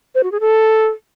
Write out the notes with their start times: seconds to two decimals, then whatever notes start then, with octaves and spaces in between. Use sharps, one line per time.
0.15 C5
0.23 F#4
0.32 G#4
0.40 A4